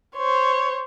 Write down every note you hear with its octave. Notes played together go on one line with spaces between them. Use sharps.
C5 C#5